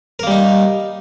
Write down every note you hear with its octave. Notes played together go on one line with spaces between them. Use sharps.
G3 A#3 D#4 A#4